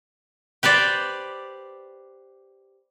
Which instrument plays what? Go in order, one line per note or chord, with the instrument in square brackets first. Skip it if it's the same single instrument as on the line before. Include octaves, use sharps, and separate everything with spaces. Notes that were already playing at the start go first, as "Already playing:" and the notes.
[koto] G4 B4 C5 D5